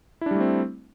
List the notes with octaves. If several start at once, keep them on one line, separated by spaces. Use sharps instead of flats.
G3 A3 C4 D4 E4